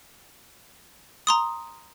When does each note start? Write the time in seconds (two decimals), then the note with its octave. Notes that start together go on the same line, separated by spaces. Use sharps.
1.27 A#5 C6 D#6